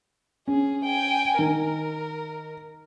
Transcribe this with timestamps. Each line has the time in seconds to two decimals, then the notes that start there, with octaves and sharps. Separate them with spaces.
0.48 C#4 G#4
0.84 G5 G#5
1.39 D#3 A#4